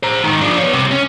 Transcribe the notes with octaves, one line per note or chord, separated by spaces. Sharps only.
C5 A#5
G#2 D#3
F3 D4
B3 C#5
C2 C3
C#4